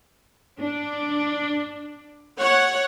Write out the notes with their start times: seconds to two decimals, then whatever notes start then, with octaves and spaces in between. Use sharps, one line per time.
0.57 D4
2.40 C#5 F#5